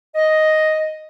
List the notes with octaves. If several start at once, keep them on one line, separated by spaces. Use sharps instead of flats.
D#5